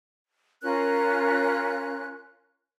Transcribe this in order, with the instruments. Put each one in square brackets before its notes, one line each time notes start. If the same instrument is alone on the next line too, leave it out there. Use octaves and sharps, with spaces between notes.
[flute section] C#4 F4 A#4 F#6